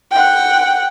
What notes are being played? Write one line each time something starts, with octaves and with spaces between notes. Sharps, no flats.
F#5 G5